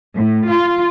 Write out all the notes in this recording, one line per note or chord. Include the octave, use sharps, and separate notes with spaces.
A2
F4